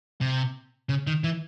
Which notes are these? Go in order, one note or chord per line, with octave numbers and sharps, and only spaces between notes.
C3
C#3
D#3
E3